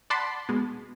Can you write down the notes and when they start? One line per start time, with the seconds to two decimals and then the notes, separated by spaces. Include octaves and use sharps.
0.10 D5 F#5 A5 B5 C6
0.49 B2 G#3